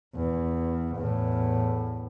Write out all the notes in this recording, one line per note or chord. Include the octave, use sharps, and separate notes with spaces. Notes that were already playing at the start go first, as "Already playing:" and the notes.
E2
E2 A2